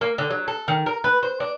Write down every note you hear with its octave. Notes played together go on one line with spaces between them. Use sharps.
A#3
D3
F#3
A4
D#3
A#4
B4
C5
D4